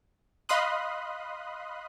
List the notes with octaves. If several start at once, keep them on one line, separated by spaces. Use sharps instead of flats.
D#5 F5 B5 C6 D#6 F#6